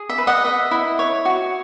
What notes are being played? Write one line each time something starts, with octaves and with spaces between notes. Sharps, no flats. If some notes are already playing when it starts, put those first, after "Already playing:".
Already playing: G#4
E5
B4
D#5 F#5
D#5 E5
E4
C#5
F#4